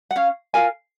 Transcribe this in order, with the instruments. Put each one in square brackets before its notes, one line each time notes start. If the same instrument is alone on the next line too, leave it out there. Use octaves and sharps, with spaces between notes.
[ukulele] F#5
C#4 C#5 F5
F4 A#4 F5 G#5